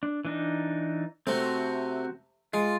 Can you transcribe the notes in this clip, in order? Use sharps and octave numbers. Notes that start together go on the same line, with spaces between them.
D4
E3 D4 D#4
C3 A3 C4 F#4
G#3 F4